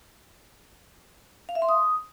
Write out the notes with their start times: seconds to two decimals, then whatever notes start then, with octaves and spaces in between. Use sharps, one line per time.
1.49 F5
1.55 E5
1.62 C6
1.69 D#6